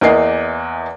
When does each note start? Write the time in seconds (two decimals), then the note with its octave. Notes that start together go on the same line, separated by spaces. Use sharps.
0.01 E2 E3 A#3 D#5 C7